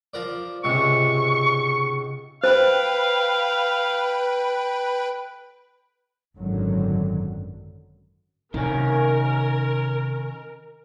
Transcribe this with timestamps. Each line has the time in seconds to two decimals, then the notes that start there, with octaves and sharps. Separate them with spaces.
0.14 F3 A#4 D5
0.64 C#2 G#2 C3 C#6
2.44 B4 C5 F5 G5 B5
6.37 G#1 F#2 D3 D#3 F#3
8.54 C3 D#3 C#4 A#4